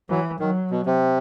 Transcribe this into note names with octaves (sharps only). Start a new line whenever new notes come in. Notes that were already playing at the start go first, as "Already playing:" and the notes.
E3 F#3
D#3 F#3
B2
C3